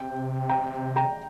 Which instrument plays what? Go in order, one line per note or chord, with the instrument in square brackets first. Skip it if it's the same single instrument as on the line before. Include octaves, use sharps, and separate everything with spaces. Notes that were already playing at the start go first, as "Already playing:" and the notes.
Already playing: [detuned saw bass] C3 [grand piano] G5
[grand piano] G5 A#5
G5 A#5